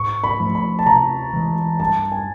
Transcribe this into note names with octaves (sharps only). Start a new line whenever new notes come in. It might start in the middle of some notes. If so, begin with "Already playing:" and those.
Already playing: G#2 C#6
B5
F3 A3
B5
A5
C3 A#5
E3 G#3
G2 A5
G#5